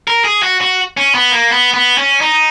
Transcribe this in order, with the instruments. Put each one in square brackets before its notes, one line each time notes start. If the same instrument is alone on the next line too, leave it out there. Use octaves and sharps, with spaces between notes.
[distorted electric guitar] A#4
G#4
F#4
F#4
C#4
B3
A#3
B3
B3
C#4
D#4